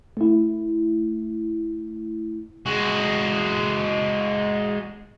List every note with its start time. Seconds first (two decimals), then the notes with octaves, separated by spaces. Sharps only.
0.17 A3 E4
2.66 G#3 F#4